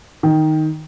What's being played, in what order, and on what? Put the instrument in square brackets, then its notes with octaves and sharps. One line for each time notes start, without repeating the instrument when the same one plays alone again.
[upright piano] D#3